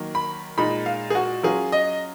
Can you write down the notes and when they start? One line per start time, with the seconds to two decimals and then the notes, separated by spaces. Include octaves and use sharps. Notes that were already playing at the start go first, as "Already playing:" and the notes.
Already playing: D#3 F#3 A#3
0.15 B5
0.58 A#2 G#3 D#4 B5
0.86 F5
1.10 G#4
1.15 F#4
1.43 F#3 C#4 F4 G#4
1.72 D#5